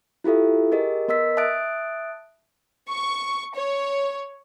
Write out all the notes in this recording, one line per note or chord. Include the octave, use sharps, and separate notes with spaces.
E4 F4 G4 A4 E5
G4 G#4 A#4 D#5
B3 A#4 D#5 E6 B6
E5 A5 D#6 F#6 A6 D7
C#6
C#5